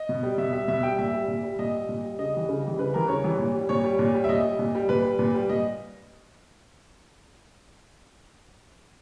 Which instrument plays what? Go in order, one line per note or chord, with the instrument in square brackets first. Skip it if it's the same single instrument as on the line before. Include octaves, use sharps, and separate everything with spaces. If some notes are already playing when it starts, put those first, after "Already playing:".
Already playing: [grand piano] D#5
B2
G3
B2 E5
G3 E5
B2 E5
G3 G5
A#2 E5
G3
A#2
G3
A#2 D#5
G3
A#2
G3
C#3 D#5
E3 G3
C#3
E3 G3
C#3 B4
E3 G3 A#4
C#3 C#5
E3 G3
A#2
G3
A#2 C#5
G3
A#2
G3
E5
A#2 D#5
G3
A#2
G3
A#2 B4
G3
A#2
G3
A#2 D#5